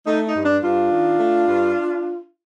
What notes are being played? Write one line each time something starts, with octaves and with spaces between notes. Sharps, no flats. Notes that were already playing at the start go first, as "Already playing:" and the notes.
A3 D#4
D#4
G2
D4
G2 D4 F4
D#3
A3
G2